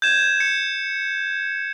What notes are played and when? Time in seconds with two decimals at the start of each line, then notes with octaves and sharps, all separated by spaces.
0.02 G6 G#6 E7
0.40 C#7